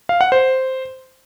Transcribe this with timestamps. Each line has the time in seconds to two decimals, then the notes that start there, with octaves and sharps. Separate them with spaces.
0.09 F5
0.21 F#5
0.32 C5